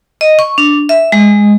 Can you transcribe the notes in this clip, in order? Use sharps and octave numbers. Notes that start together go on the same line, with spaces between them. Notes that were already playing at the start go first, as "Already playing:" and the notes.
D#5
C#6
D4
E5
G#3